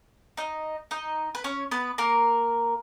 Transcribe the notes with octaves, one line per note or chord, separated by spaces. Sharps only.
D#4 D#5
D#4 D#5
B4
C#4 C#5
B3 B4
A#3 A#4